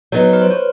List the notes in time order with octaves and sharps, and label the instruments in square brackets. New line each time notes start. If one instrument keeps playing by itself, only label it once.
[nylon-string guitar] F#3 B3 D#4 [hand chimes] C#5
[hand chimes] B4
C5
C#5